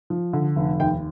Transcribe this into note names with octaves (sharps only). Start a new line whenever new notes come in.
F3
D3
F1
D#2 G5